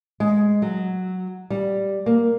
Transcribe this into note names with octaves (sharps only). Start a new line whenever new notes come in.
G#3
F#3
G3
A#3